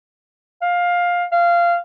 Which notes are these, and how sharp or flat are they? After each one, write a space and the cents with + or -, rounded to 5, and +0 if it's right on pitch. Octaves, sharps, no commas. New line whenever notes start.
F5 +15
F5 -15